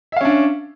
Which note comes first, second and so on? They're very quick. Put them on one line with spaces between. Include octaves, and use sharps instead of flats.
E5 F5 C#4 D4